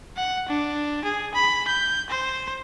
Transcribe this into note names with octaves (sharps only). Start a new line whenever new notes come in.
F#5
D4
G#4
B5
G6
C5